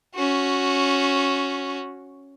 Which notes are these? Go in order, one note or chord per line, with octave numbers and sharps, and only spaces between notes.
C#4 F#4